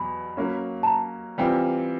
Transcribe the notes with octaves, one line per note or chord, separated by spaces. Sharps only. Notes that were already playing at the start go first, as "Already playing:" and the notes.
Already playing: E2 B2 F#3 B5
F#3 A#3 C#4
A5
A#5
E3 G3 C4 F4